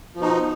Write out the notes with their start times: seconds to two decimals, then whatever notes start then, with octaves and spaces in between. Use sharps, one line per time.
0.15 F3
0.18 B2
0.22 D#4